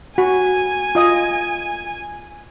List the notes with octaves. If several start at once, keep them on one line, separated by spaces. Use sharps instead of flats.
F#4 G#5
F4 D#5 D#6